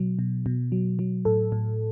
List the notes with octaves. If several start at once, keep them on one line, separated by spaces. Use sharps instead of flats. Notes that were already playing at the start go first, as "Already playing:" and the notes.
Already playing: B2 F#3
B2
B2
F#3
F#3
A2 A4
A2